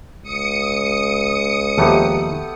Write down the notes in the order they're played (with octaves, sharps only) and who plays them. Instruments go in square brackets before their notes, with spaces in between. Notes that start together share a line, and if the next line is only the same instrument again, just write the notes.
[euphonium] C#2 [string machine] D#6 C#7
[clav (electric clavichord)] D#2 F3 D#4 [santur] A3 B3 G4